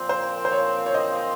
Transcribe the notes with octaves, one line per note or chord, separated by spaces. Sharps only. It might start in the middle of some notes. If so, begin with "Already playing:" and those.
Already playing: A#2 F3 C4
C5
C5
C#5
C#5
D#5